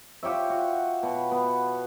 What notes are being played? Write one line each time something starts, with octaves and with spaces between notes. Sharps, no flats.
F4 G4 C#5 E5
F#4
B2
B3